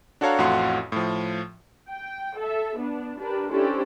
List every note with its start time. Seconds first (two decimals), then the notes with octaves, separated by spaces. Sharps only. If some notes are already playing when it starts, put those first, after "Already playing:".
0.21 D4 F#4 A4 C#5 F5 A#5
0.38 A1 F2 A2 F#4 F5 C6
0.92 A2 F3
1.88 G5
2.36 A4 E5
2.76 B3 D4
3.18 D4 G4 A#4 B4
3.49 C#4 D4 E4 G4 A4 C5